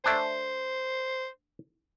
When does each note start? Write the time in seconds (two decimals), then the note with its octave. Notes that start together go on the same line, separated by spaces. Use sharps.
0.04 A3 D4 C5 G#5